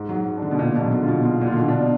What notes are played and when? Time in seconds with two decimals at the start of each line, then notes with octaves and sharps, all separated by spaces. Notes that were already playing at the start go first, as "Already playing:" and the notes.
Already playing: G#2
0.09 F#3
0.15 G#2
0.37 D4
0.42 D3
0.51 B2
0.59 A#2 D4
0.75 B2
0.81 F#3
0.92 D3
1.03 B2 F4
1.25 B2 F4
1.41 A#2
1.47 F4
1.52 D3
1.57 B2
1.69 D4
1.74 B2